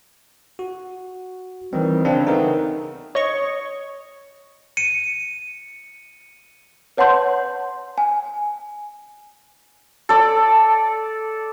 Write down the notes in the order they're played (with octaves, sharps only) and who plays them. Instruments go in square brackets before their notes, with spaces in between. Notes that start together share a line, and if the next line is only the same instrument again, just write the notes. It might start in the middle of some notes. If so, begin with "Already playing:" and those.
[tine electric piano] F#4
[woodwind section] D#3 G3 [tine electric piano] E3 C4
[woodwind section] C#3 [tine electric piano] C4 D4
[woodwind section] A3 B3 C4 [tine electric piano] D#4 A#4
[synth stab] C#5 D#5 C#6
[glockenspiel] C#7 D#7
[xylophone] B4 C#5 F#5 A5 C6 G6
G#5
[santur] A4 D5